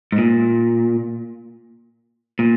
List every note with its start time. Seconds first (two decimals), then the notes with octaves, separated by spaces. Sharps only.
0.12 G#2
0.18 A#2
2.39 A#2